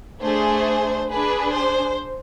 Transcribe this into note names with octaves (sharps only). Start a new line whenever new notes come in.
A3 D4 G#4 C5
D4 G#4 B4
C5